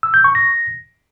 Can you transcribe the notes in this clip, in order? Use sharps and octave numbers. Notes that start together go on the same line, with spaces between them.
E6
G6
C#6
A#6